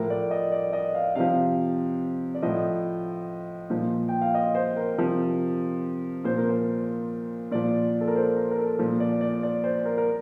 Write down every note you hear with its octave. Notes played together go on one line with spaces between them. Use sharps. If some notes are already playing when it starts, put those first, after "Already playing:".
Already playing: A2 F3 A#4
D5
D#5
D5
D#5
F5
C3 F3 F5
D5
A2 F3 D#5
A#2 F3
G5
F5
D#5
C5
A#4
C3 F3
A#2 F3 C5
A#4
C5
A#2 F3 D5
A4
A#4
C5
A#4
A#4
A4
A#2 F3
D5
D5
D5
C5
A#4
A#4